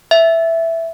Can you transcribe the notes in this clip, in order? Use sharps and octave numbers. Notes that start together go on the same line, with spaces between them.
E5